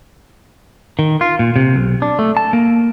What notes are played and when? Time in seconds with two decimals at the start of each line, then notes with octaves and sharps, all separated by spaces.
0.99 D#3
1.21 F4
1.39 A#2
1.56 C3
1.76 B1
2.02 D4
2.19 A3
2.37 A5
2.53 A#3